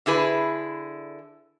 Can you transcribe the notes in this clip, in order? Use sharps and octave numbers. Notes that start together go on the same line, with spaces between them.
D3 E4 G#4 B4